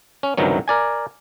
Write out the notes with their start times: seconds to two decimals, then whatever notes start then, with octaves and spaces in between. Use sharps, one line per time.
0.23 C#4
0.37 C#2 G2 C3 D#3 F#3
0.68 A#4 D5 G#5